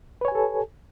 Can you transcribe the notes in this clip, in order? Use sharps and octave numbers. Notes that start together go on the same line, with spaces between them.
G4 A4 B4 C#5 G#5